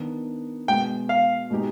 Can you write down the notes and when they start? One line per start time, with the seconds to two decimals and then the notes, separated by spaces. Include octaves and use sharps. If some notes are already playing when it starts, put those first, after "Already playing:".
Already playing: D#3 B3 D4
0.68 B2 G#3 B3 G5
1.09 F5
1.50 B2 G#3 B3 D#4 G4